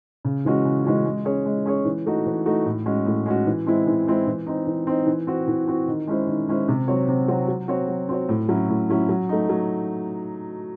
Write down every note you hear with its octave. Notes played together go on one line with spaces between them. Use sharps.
C#3
E3 G#3 C#4 F#4
C#3
E3 G#3 C#4 F#4
G#3
C#4 G#4 C#5
G#3
C#4 G#4 C#5
E3
A3 D#4 F#4
E3
A3 D#4 F#4
A2
G#3 C#4 F#4
A2
G#3 C#4 F#4
E3
G#3 C4 E4
E3
G#3 C4 E4
E3
C4 D#4
E3
C4 D#4
E3
C4 F#4
E3
C4 F#4
D#3
G#3 C#4 E4 C5
D#3
G#3 C#4 E4 C5
C3
F#3 C4 F#4 C#5
C3
F#3 C4 F#4 C#5
F#3
C4 F#4 C#5
F#3
C4 F#4 C#5
A2
F#3 C#4 E4
A2
F#3 C#4 E4
F#3
A3 D#4
F#3